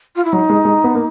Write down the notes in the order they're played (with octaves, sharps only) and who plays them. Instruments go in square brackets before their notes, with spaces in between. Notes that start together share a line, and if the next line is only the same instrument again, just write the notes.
[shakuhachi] F4
E4
[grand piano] F#3 [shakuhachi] D#4
[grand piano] G#3
G#3
B3
A#3